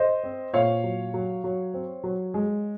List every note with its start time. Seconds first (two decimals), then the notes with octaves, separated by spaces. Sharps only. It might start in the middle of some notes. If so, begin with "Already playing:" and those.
Already playing: C5 D#5
0.23 C4
0.53 A#2 C#5 F5
0.84 F#3
1.14 F#3
1.44 F#3
1.74 C4
2.04 F#3
2.34 G#3